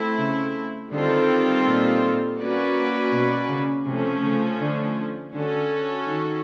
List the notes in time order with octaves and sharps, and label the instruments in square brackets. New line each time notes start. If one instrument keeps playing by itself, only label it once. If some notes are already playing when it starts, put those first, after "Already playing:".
Already playing: [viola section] A3 C4 E4
[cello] C#3
[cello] D3 [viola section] D#3 G3 C4 F4 A4
[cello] A#2
[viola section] A#3 C#4 F#4 B4 D5
[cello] B2
C#3
[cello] C3 [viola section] F3 A3 C#4
[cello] C#3
D3
[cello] D3 [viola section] C#4 F#4 A4
[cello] D#3